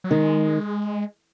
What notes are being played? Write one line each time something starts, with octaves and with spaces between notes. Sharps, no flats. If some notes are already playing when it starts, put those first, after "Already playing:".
F#3
D#3 G#3